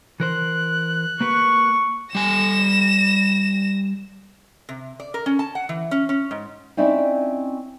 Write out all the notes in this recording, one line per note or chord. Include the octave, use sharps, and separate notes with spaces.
E3 A#4 C5 F#6
A#3 G4 B4 C#6
G3 G#5 A#6 E7
C3
D5
A#4
C#4
A5
F#5
E3
C#4
C#4
G#2
C4 C#4 D#4 E4 D5 E5